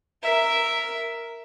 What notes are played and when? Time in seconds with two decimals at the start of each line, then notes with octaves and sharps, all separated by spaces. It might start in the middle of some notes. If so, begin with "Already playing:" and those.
0.22 A#4 E5